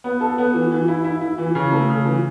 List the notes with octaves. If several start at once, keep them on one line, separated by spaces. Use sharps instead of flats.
B3
A4
B3
E3
E3
E4
E4
E4
E3
C#3
A3
C#3
E3